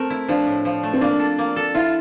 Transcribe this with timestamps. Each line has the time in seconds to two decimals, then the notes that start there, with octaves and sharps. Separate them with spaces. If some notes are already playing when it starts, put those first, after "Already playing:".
Already playing: A3 C4 A#4
0.10 E4
0.28 F3 D4
0.47 A2
0.65 F3
0.83 A3
0.93 C4
1.01 A#3 D4
1.19 A4
1.38 A#3
1.56 A4
1.75 E4 F4